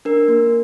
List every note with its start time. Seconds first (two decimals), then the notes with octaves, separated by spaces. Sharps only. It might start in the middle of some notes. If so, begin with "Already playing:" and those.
0.05 D4 A#4
0.28 A#3